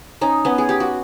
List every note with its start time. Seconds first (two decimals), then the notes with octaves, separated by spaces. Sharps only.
0.21 C#4 D#4
0.45 B3 C#4
0.58 G#4
0.69 G4
0.80 F#4